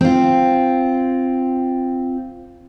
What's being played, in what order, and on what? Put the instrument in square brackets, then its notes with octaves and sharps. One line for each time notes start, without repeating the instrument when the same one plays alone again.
[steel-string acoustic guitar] C4 F4